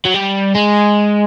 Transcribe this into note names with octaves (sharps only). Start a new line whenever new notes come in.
F#3
G3
G#3